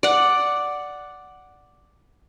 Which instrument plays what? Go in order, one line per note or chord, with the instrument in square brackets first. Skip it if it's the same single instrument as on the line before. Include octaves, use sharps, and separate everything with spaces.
[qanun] D5 F#5